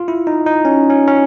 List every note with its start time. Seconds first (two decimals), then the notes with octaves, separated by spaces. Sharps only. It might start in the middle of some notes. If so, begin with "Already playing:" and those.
Already playing: F4
0.08 E4
0.27 D#4
0.46 D#4
0.65 C#4
0.90 C#4
1.08 C#4